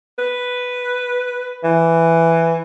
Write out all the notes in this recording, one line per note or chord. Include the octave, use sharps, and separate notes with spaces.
B4
E3